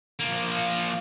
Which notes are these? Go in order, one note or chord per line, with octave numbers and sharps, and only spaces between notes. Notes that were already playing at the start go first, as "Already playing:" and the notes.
F3 A#3